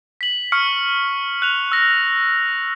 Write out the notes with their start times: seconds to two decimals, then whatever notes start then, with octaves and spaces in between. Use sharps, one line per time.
0.21 B6 F#7
0.52 C#6 F6 C#7
1.42 F#6 F7
1.72 E6 A#6